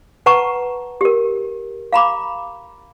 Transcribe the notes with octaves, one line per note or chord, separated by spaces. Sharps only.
B4 F#5 A5 A#5 C#6
G4 A#4
F5 A#5 B5 D6